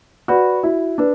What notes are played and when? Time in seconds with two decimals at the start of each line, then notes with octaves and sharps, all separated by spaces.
0.28 F#4 B4 D5 B5
0.63 E4 F#4
0.98 D4 B4